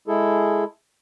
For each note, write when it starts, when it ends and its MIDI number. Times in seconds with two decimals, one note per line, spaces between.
0.08 0.64 56
0.08 0.64 64
0.08 0.64 68
0.08 0.64 69